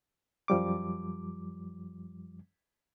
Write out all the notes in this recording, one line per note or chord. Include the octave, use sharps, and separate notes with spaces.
F#2 F3 G3 D6